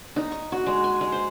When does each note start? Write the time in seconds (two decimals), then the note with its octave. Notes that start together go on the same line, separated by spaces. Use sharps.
0.16 D#4
0.32 C#6
0.52 F#4
0.67 G#3
0.84 G#5
1.01 G#3
1.12 C5